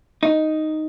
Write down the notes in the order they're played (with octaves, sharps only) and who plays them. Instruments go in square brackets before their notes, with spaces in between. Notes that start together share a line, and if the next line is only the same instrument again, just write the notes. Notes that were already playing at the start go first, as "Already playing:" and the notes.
[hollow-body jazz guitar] D#4